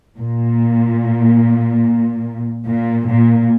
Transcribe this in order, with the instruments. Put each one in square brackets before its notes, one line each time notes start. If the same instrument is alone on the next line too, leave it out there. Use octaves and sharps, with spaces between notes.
[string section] A#2
A#2
A#2